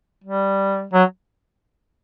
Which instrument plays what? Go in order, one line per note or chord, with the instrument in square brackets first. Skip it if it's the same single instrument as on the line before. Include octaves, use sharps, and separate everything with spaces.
[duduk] G3
F#3